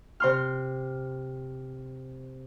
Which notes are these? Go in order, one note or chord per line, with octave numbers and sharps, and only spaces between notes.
C3 C6 F6